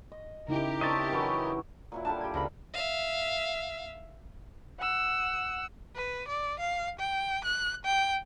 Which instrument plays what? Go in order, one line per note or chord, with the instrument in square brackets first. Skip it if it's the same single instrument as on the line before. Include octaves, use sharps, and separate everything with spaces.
[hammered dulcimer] D#5
[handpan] C#3 D#4 E4 [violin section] G4 A#4
[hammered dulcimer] C4 D4 C#5 [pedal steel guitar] D#5 E5 A5
[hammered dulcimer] E3 F#3 C#4
A#2 F#3 E4
[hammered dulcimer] D3 G3 D4 [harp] A5
[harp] G4 G#6
[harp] C#2 A#4 B5 [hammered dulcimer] C5
[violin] E5 F5
[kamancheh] F#5 E6
[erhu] B4
D5
F5
G5
F#6
G5